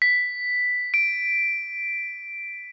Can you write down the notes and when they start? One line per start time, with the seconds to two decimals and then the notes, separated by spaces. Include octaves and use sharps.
0.02 B6
0.94 D7